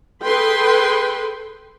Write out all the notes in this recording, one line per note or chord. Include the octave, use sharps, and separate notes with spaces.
G#4 A4 B4 G5 C6